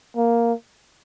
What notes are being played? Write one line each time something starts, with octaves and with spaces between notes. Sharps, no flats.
A#3